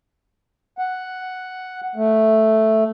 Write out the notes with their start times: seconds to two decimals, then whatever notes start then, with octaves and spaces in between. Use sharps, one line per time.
0.78 F#5
1.96 A3